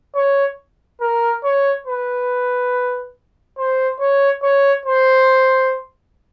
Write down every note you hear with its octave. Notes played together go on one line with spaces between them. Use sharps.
C#5
A#4
C#5
B4
C5
C#5
C#5
C5